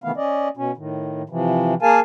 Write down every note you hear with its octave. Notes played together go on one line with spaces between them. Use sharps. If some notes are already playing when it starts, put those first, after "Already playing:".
C3 D#3 E3 A3 B3 F5
C#4 D5 D#5
B2 C#4
A2 D#3
C3 E3 F3
A#3 G#4 A#4 F5 G#5 A5